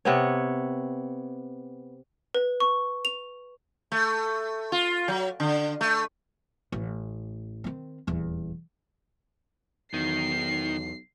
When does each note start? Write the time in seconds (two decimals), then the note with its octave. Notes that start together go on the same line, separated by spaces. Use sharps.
0.05 C3 B3 C#5
2.35 B4
2.60 C#6
3.05 F7
3.92 A3
4.72 F4
5.08 F#3
5.40 D3
5.81 A3
6.72 A1
7.64 D#3 C4
8.07 D#1 E2
9.93 B1 E2 D#3 C7